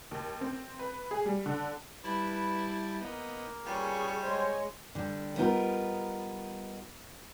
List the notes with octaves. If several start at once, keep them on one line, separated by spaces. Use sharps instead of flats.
D#2
C4
B4
G#4
G3
D3
G3 E4 B4 A5
A#3 B3 D#4
G3 C#4 F4 G#4 B4 C#6
G#3 C5 C#5 G#5
D3 G3
F#3 G3 B3 D#4 F4 A#4